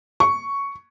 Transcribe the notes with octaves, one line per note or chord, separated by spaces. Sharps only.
C#6